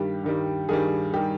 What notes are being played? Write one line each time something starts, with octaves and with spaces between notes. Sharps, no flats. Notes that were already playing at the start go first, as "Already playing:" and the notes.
Already playing: G2 D#3 G3 G4
G2 D#3 G3
G2 D#3 G3 G#4
D#3 G3 G4